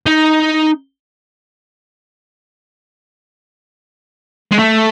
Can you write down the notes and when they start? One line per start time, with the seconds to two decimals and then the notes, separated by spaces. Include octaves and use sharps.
0.06 D#4
4.52 G#3
4.59 A3